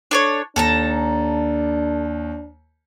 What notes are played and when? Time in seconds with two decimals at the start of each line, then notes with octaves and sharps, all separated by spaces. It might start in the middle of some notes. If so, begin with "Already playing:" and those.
0.11 D4 A4 C#5
0.56 D#2 D4 A4 A5 A#5